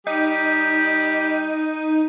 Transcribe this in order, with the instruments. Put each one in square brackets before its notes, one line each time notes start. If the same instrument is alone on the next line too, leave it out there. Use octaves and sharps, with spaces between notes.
[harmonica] G3 G4 [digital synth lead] D#4